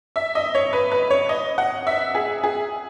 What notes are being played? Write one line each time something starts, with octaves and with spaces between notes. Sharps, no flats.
E5
D#5
C#5
B4
B4
C#5
D#5
F#5
E5
G#4
G#4